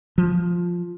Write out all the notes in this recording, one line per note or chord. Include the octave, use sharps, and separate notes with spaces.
F3